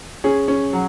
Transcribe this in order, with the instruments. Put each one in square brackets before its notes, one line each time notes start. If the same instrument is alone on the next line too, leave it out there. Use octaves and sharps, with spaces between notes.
[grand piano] C#4 G#4
C#4
F#3